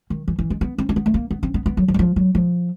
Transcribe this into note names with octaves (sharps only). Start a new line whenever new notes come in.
D#3
E3
E3
G#3
B3
C4
C4
B3
A3
A#3
B3
C4
B3
B3
F#3
F3
F#3
F3
F#3
F3